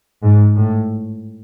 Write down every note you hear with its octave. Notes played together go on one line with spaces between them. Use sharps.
G#2
A2